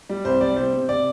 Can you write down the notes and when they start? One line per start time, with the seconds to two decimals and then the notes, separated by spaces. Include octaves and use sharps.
0.09 G3
0.25 C2 C5
0.40 G3 D5
0.56 C3 C5
0.73 C3
0.89 C3 D5